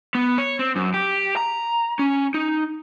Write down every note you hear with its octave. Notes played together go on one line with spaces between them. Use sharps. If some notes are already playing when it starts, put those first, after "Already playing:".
B3
C#5
C4
F#2
G4
A#5
C#4
D#4